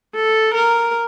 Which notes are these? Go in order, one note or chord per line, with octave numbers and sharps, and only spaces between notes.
A4
A#4